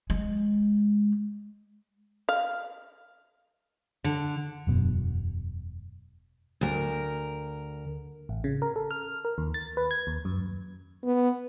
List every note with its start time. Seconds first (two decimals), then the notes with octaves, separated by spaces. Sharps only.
0.10 G#3
2.29 F5
4.04 D3
4.67 E1 F#2 B2
6.61 D2 A#4
8.29 A1
8.44 C#3
8.62 A#4
8.76 A4
8.91 F6
9.25 A#4
9.38 D#2
9.54 A6
9.77 B4
9.91 G#6
10.07 D#2
10.25 F#2
11.04 B3